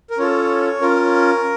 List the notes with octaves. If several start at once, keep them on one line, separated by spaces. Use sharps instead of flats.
A#4
C#4 F4 A4 C#5
C#4 F4 A#4